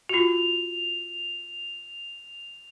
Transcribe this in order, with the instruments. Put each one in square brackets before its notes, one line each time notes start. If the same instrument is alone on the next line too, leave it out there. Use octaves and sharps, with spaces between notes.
[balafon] F4 F#4 [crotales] F7